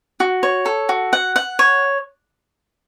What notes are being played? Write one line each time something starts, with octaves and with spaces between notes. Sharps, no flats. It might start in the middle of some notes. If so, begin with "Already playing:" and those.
F#4
C#5
A4
F#4
F#5
F#5
C#5